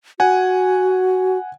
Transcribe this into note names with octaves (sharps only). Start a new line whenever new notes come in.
F#4 F#5 G#5